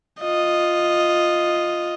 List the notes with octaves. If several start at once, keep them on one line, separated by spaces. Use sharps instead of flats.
F4 D#5